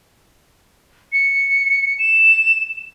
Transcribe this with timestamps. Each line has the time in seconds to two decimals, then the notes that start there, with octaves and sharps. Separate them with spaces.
1.13 C#7
1.99 E7